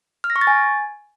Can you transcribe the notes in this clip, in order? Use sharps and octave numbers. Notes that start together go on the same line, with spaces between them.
F6
A#6
C#6
A6
G#5